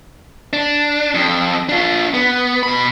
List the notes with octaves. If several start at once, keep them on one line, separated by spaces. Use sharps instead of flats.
D4
F2
D4 F4
B3
B2 B5